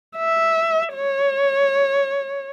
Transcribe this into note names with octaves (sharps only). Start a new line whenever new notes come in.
E5
C#5